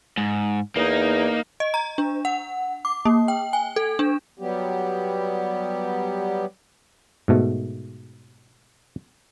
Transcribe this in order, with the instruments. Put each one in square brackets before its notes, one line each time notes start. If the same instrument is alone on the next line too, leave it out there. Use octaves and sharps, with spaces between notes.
[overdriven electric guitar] G#2
[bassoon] E2 [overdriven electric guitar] A#3 [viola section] D#4
[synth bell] D#5
A#5
D4
F#5
D6
A#3
G5
G#5
A4
D4
[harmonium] F#3 G3 B3 G4
[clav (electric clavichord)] G#2 B2 A3